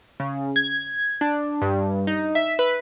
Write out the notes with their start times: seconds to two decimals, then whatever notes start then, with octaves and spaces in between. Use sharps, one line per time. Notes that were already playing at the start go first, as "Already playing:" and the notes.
0.20 C#3
0.56 G#6
1.21 D4
1.62 G2
2.07 D#4
2.35 E5
2.59 B4